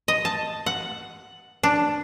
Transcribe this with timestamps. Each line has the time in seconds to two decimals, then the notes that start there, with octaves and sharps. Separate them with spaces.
0.08 D#5
0.25 A5
0.66 F#5
1.63 D4